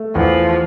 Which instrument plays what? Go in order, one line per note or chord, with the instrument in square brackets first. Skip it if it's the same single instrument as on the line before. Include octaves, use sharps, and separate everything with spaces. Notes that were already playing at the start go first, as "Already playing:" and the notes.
Already playing: [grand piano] A3
[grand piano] E2 [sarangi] F3